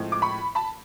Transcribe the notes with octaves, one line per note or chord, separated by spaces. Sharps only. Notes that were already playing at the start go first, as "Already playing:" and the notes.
Already playing: A2 F3 G#3 C4
D6
B5 C#6
A5 B5